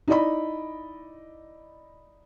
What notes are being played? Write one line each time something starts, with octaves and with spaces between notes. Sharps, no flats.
D#4 E4 D5 D#5 B5